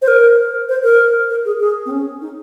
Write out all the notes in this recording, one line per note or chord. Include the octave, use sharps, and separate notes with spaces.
C5
A#4
C5
A#4
A#4
G#4
G#4
C4
C#4
D#4